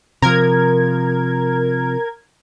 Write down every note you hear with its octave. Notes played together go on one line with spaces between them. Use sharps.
C3 F3 A#4 G#6